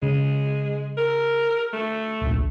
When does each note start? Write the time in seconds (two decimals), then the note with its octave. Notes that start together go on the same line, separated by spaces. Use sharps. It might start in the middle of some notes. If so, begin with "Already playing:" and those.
0.03 C#3 G#3
0.98 A#4
1.73 A3
2.21 D1 A#1